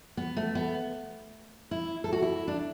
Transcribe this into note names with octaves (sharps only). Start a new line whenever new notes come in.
B3
A3
B3
E4
A4
F#4
E4
D4